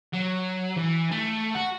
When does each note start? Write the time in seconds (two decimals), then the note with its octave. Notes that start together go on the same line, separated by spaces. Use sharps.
0.14 F#3
0.77 E3
1.11 A3
1.55 F#4